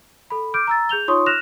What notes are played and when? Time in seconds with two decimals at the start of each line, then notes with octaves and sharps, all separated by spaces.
0.30 A4 B5
0.54 D6 F6 G6 D7
0.67 A#5 E6 A6
0.89 G#4 G6 F7 G7
1.08 D#4 F4 C#5 C6 C#6 D#6
1.26 F6 F#6 A#6 E7 F7